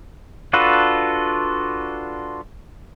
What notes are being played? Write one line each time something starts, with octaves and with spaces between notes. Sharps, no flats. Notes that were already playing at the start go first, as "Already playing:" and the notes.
D4 F4 F#4 A4 B4